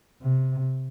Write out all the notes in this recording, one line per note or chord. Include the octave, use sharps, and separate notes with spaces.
C3